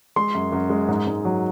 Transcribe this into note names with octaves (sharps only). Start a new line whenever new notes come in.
G#3 C6
F#2
F#2
G#3
G#2
G#2
F#3